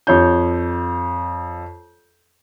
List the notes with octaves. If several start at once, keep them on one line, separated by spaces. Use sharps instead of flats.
F2 C#5 G6